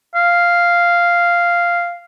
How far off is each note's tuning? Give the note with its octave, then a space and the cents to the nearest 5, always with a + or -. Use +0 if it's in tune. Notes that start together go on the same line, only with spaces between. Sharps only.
F5 -5